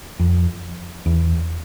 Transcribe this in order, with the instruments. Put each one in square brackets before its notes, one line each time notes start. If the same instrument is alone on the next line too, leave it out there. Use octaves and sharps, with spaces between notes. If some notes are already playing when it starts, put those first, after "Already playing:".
[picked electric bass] F2
E2